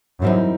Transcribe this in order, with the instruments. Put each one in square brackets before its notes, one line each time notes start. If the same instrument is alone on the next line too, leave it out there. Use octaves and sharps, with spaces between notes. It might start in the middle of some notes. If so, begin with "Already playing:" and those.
[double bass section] F#2 [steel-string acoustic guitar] E3 G3 C4 D#4